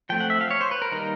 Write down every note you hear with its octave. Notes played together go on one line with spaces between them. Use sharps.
F3 A3 C4 G5
F#5
E5
F5
C#5
C5
B4
A#4
D#3 G3 A#3 D#4 A#4